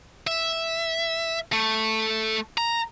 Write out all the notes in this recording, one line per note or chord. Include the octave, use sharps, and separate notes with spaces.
E5
A3
A#5